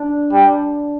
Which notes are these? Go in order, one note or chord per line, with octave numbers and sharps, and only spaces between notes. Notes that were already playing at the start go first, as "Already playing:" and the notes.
Already playing: D4
G3